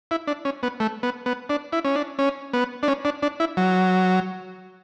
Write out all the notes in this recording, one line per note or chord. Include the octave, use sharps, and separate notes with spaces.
E4
D4
C#4
B3
A3
B3
B3
D4
E4
C#4
D4
C#4
B3
D4
C#4
D4
D4
E4
F#3